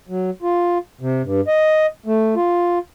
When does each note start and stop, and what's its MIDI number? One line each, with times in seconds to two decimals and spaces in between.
0.09 0.30 54
0.42 0.78 65
1.01 1.22 48
1.24 1.41 43
1.48 1.86 75
2.06 2.35 57
2.36 2.79 65